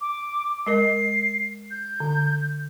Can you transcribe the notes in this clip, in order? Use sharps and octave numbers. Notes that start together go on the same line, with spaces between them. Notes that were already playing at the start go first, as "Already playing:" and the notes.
D6
G#3 A#4 D#5 C7
G6
D3